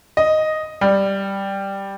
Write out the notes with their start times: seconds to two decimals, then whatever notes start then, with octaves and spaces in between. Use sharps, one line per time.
0.17 D#5
0.81 G3